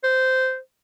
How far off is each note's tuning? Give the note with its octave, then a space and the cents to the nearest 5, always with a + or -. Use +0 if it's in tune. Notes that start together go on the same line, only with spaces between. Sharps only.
C5 -10